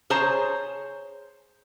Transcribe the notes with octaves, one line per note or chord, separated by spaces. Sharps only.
G#4 C5 C#5 A5 A#5